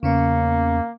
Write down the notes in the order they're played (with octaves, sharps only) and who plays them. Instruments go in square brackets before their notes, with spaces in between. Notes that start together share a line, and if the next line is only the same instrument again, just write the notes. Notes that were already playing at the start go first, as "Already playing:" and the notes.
[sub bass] E2 [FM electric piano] C#3 B3 C#4 [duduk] A#3